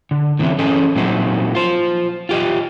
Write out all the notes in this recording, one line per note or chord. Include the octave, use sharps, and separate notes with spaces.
D3
A2 D3 E3 F#3 C4
E3 C#4 G#4 A4 D#5
A#2 F#3 A3 C4 D#4 F#4
F4 C5
F4 G4 D#5